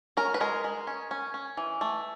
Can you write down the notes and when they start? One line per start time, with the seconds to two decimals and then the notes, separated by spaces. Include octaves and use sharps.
0.17 C#4 A#4
0.34 B4
0.41 G#3 A#4
0.64 G#3
0.87 C#4
1.11 C#4
1.34 C#4
1.57 E3
1.81 A3